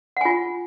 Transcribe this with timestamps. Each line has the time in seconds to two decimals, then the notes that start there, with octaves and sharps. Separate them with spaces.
0.17 F#5
0.21 G#5
0.25 F4